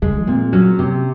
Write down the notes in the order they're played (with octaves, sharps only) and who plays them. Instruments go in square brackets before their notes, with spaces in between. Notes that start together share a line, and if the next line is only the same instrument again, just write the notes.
[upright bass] C#3 [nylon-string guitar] G#3
[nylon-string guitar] A#2 [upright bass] C4
[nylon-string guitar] F#3 [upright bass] C#4
[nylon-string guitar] C3